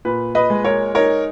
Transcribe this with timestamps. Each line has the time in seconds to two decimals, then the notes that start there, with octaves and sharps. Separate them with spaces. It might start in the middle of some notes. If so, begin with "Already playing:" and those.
0.05 A#2 B4
0.35 B4 D#5
0.50 G#3
0.64 A#4 C#5
0.95 D#4 A#4 C#5